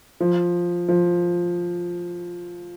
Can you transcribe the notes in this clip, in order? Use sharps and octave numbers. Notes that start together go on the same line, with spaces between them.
F3
F3